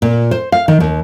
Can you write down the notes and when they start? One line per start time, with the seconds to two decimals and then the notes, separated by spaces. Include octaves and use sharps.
0.02 A#2
0.31 C5
0.52 F5
0.68 D#3
0.80 D#2